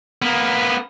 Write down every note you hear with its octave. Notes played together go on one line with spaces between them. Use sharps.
A#3 B3